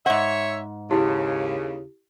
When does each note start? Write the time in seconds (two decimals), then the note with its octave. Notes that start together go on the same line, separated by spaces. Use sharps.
0.06 G#2 C#5 E5 F#5
0.91 D#2 C#3 E4 G4